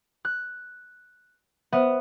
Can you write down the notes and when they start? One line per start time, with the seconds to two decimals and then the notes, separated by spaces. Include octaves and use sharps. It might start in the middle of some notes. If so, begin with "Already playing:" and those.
0.25 F#6
1.73 B3 C5 E5